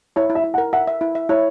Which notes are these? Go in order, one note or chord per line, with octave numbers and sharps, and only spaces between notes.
E4 C#5
E4
E5
E4
F#5
A#4
E5 F#5
E5
E4
E5
E4 C#5